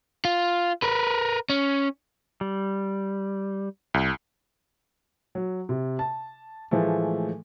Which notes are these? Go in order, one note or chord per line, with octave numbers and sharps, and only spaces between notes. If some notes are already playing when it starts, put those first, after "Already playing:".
F4
A#4 B4
C#4
G3
C2
F#3
C3
A5
A2 E3 F3 G#3 A3